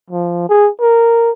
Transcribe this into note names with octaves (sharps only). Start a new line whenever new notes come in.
F3
G#4
A#4